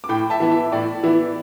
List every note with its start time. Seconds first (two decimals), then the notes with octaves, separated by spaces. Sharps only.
0.04 D6
0.09 A2 G5 B5
0.30 E5 A5
0.40 E3 B3 E4
0.51 E5
0.72 A2 D5
1.03 E3 B3 E4